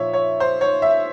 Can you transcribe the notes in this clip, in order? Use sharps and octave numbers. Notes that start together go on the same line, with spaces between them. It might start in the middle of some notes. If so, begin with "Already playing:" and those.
Already playing: A#2 F3 C#5 E5
C#5
C5
C#5
E5